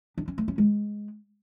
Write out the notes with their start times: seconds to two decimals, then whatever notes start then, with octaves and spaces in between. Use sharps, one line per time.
0.18 D4
0.28 C#4
0.38 A3
0.48 C#4
0.58 G#3